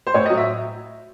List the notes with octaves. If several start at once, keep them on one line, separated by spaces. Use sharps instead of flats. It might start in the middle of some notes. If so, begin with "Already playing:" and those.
C5
A2 C#5
D#5
F#3
E5